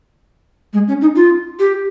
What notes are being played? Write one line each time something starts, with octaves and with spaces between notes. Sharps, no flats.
G#3
C#4
D#4
F4
G4